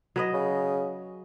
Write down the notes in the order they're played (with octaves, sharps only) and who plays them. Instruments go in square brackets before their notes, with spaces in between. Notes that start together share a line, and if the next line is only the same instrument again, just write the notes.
[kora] F#3 B4 D#5
[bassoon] C#3